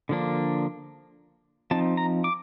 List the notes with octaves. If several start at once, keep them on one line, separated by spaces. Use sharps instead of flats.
D3 F3 A#3 D4
F3 C4 D#4 A5
A#5
D6